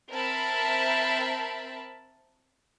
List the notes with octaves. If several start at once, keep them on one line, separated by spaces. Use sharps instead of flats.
C4 A#4 E5 A5 B5